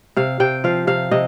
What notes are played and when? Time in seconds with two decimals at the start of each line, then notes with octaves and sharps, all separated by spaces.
0.17 C3 F5
0.40 C3 G5
0.64 F3 F5
0.87 C3 F5
1.11 C3 D#5